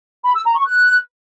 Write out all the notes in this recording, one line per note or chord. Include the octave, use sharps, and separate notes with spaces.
B5
E6
A#5
C#6
F#6